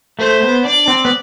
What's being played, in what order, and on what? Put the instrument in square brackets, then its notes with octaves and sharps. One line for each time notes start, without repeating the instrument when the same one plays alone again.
[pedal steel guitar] A3 [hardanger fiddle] C5
[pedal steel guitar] B3
[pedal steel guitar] D4 [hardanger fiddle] D5
[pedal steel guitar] C4
B3